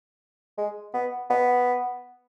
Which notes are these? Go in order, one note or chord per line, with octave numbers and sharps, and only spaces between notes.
G#3
B3
B3